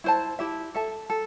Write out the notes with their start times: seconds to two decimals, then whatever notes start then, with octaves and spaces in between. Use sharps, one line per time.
0.04 E4 C5 A5
0.39 E4 G4 E5
0.74 A4 E5 A5
1.10 A4